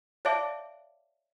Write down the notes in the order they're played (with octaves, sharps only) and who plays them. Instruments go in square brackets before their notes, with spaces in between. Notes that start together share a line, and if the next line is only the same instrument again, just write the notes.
[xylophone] C#5 D5 E5 F5 A5 D6